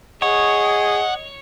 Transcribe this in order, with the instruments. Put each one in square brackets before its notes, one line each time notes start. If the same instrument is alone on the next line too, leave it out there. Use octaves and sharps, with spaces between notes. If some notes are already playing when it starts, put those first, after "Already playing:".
[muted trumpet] G#4 [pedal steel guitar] C#5 [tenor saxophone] D#5 [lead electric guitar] F#5